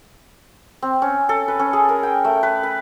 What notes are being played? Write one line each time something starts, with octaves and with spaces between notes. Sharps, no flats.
C4
C#4
A4
B4
C#4
G#4
A#4
G5
A3
B4
B5